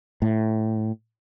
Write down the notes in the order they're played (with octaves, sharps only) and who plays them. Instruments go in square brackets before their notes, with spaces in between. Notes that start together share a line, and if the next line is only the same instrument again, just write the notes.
[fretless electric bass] A2